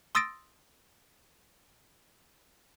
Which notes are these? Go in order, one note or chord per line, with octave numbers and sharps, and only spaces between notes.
C6 D#6 E6 A6 A#6 D7